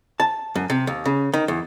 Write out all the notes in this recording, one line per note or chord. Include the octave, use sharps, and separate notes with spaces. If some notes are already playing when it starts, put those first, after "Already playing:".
A5
F#2
C3
D#2
C#3
D#3
E2